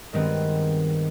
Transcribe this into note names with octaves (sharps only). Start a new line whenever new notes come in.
G2 D#3 G#3 B3 C4